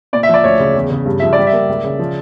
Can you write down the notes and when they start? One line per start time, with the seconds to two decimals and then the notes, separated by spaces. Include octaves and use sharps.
0.13 A#2 D5
0.23 E5
0.29 F3 D5
0.44 D2 C#5
0.60 C#3
0.75 E2
0.91 C#3
1.06 G2
1.20 F3 E5
1.33 D5
1.38 G3
1.47 E5
1.53 A#3
1.69 C#2
1.84 C#3
1.99 F3